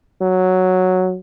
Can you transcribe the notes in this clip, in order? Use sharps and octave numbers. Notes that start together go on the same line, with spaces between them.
F#3